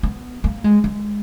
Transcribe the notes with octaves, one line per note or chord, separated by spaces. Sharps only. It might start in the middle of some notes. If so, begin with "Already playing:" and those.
B3
A#3
G#3
G#3